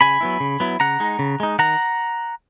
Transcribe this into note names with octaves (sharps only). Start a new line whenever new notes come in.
C#3 G#5 B5
F#3 B3 E4
C#3
F#3 B3 E4
C#3 F#5 A#5
G#3 D#4
C#3
G#3 D#4
D#3 F#5 A#5